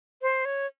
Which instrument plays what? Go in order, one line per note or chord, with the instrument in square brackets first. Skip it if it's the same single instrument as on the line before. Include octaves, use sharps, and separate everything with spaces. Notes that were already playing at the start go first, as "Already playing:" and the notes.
[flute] C5
C#5